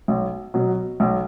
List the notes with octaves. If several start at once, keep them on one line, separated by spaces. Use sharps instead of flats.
B1
B2 F#3
B1